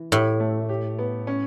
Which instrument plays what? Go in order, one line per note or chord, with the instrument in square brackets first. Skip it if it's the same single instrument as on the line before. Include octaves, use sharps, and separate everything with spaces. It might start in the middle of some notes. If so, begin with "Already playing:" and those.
Already playing: [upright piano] E3
[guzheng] A2 [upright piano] G4
[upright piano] A3
G4
B3
C#4